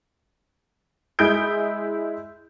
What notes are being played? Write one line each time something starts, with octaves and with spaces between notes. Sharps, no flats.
G#3 E4 G#4 D#6 G6 D7